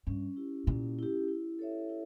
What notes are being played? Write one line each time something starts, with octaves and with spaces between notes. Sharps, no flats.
G2 C#4
E4 G4
A#2 C#4
E4 G4
E4
A4 C#5 E5
E4